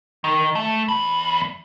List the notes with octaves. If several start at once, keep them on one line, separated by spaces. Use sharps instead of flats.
D#3
A3
E2 B5